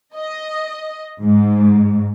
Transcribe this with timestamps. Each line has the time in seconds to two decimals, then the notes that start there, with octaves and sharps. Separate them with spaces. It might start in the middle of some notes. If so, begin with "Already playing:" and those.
0.16 D#5
1.22 G#2